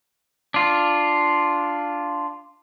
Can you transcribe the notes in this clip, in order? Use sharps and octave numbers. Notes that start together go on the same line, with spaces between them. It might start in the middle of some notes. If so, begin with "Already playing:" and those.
D4 F4